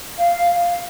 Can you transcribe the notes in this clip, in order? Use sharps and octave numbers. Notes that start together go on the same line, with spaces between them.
F5